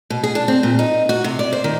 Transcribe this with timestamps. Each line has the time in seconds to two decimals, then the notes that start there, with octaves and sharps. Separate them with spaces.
0.10 B2
0.24 G#4
0.35 D4
0.48 C4
0.63 A#2
0.79 D#4
1.09 F#4
1.24 C3
1.39 D5
1.53 C5
1.64 D#3